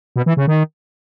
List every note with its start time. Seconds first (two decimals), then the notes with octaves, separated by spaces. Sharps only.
0.16 B2
0.26 E3
0.37 C#3
0.47 D#3